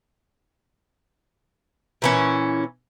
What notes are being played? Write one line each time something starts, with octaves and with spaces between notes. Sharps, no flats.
A#2 E3 C#4